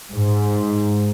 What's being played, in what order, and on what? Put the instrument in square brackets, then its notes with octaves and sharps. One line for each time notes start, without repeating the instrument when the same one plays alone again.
[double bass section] G#2